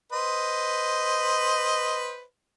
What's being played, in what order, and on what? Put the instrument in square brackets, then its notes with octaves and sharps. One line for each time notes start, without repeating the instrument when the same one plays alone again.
[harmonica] B4 C5 D#5